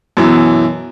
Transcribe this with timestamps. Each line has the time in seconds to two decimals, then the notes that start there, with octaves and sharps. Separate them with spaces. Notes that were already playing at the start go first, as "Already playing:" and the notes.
0.17 F#2 B2 E3